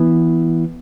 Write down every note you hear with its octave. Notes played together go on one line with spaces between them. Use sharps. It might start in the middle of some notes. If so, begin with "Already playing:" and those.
Already playing: E3 B3 E4